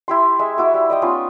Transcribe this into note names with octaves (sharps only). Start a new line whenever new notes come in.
E4 G4 C6
G#3 E5
E4 F#4 D6
G3
D5 D#5 G5
B3 C#4 D#4 F4